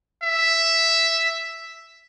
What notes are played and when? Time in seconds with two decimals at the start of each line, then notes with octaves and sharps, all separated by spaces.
0.23 E5